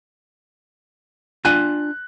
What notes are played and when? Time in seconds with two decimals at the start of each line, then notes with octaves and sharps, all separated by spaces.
1.45 D4 F4 G#5 F#6